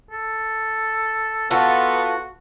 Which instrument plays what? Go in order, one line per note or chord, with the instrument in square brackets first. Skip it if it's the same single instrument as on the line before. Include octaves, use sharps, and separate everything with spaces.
[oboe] A4
[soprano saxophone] B3 [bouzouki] F4 A4 [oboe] F#4